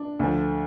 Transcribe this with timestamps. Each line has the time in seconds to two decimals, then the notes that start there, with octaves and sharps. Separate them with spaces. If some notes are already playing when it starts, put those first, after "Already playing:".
Already playing: D4
0.19 D2 D3 F3